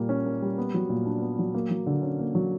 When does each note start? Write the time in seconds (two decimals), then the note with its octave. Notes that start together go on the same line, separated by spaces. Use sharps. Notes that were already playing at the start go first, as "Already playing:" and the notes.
Already playing: A#2 G3 A#3
0.09 C#4
0.26 A#3
0.42 G3
0.58 B3
0.74 F#3
0.89 A#2
1.06 D4
1.22 B3
1.39 F#3
1.54 A#3
1.70 F#3
1.86 D3
2.02 C#4
2.19 A#3
2.35 F#3